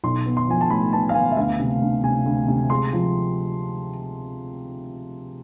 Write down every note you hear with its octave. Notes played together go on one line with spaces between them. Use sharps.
B1 C6
B3
C6
F3 G#5
A5
A2 B5
B3 A5
F5
B3 G#5
E5
D2 F5
C3
D2
C3 G#5
D2
C3
G#3 C6
F3